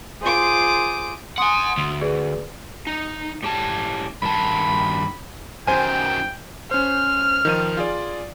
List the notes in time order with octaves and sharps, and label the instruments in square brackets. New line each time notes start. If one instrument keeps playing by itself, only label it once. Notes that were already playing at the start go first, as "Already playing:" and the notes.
[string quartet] F4 G#4 C5 D6 D#6
[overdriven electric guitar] F#5 G#5 [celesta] C6 D#6 C#7
[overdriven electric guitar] D2
[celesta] G#4 B4 D5
[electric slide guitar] D#4
A2 G4 A5
[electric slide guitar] G2 D#3 A5 [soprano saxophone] B5
[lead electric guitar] F#2 D#3 [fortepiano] C5 G#5 [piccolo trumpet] G5
[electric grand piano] C#4 C5 [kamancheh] F6
[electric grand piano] D#3 F3 D#7
F4 G#4 D5